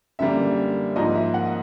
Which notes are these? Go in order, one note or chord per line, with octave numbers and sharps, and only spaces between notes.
F#2 D3 G3 A#3 E5
G#2 F3 A#3 D#5
E5
F#5